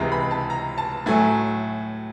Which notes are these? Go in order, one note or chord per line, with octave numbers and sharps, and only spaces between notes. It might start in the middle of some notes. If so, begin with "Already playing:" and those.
Already playing: C#2 C3 E3 G#3 A#5
B5
A5
A#5
A5
A2 F#3 A3 G#5